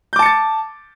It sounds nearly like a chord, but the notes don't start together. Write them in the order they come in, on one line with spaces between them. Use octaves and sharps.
G6 D6 A5 C#7 A6